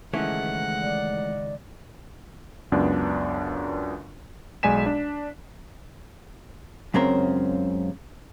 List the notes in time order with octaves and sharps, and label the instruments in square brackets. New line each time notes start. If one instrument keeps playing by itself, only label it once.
[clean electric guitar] C#2 D#3 G#3 [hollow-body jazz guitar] E3 A3 C#4 [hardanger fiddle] F#5
[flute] D5
[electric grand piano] C#2 F#2 B3 D4
B1 G#3 D5 G#5 B6 E7
D4
[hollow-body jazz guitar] C#2 F#2 C#3 C4 A#4